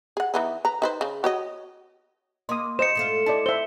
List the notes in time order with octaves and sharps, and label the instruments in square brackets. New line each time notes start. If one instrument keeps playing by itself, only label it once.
[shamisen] G#4 F#5
E3 B3 D#4
B4 A#5
D#4 B4 C5
C#3
F#4 C#5 D#5
[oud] A#3 [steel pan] D#5 D#6 [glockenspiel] C6
[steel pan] C5 D#5 [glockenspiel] C#7 E7
[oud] G#2 A3 F4
[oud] E4 [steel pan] D5 D#5 A5
[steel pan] C5 E5 [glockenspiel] G7